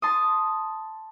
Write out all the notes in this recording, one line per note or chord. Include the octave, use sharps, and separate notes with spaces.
A5 C6 D#6